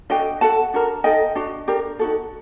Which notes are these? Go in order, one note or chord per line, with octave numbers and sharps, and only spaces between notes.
D4 F#4 A4 D#5 G5
F#4 A4 F#5 A5
D4 F#4 A#4
D#4 A4 D#5 G5
D4 F#4
D4 G4 A#4
D#4 F#4 A4